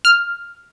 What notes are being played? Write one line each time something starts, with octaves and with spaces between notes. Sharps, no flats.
F6